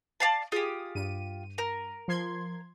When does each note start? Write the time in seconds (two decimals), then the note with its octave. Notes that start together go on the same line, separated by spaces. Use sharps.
0.20 D5 F5 A5
0.52 F4 G4 G#4 D#6
0.95 G2 D#7
1.58 A#4
2.08 F3 C6 G#6